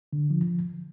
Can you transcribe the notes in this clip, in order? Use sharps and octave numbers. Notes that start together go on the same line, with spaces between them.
D3
F3